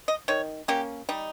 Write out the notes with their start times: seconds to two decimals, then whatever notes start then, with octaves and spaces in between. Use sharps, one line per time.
0.08 D#5
0.28 D#3 C#5
0.68 A#3 C#4 G4
1.09 G3 D#4